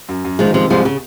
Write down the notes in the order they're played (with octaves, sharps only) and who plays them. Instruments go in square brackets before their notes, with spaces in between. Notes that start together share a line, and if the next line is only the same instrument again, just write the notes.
[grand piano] F#2
F#2
[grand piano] D#3 [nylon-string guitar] F3 G#3
[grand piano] C3 [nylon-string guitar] F3 G#3
[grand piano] C2 [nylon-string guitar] F3 G#3
[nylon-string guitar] C#3